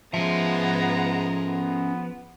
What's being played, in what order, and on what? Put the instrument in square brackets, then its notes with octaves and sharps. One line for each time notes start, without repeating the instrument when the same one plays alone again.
[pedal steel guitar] F3 [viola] G#3 A#5 [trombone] B3 [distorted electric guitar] C#4 E5
[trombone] B3